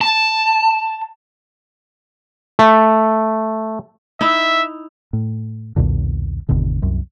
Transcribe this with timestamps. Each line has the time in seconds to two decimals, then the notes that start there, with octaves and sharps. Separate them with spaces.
0.01 A5
2.59 A3
4.21 D#4 E4 E5
5.13 A2
5.76 B1 E2 A#2 D3
6.49 G#1 E2 B2 D3
6.82 C2 F#2